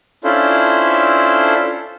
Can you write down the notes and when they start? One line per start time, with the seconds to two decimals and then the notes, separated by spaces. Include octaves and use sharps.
0.24 C#4 D4 E4 F4 A4 C5